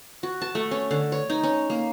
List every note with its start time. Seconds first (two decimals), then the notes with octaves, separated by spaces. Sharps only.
0.23 F#4
0.41 A5
0.55 A3
0.71 C#4
0.91 D3
1.12 C#5
1.30 D#4
1.43 C#4
1.70 A#3